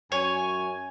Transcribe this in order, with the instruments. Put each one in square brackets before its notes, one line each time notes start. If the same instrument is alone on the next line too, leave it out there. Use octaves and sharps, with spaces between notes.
[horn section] F#2 G#5 [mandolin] C#5